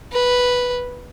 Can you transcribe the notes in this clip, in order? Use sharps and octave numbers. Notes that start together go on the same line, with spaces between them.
B4